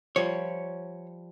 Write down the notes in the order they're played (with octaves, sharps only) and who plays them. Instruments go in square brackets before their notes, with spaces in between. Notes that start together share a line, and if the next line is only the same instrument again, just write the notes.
[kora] F3 G3 [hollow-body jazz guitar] C#5